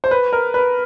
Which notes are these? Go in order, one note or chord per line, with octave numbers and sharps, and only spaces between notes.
C5
B4
A#4
B4